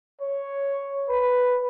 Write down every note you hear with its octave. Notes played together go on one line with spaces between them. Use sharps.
C#5
B4